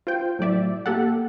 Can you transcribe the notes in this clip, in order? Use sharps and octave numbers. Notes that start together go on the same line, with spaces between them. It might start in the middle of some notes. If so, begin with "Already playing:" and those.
F4 C5 G5
A2 F#3 D5 E5
A#3 G4 A4 F#5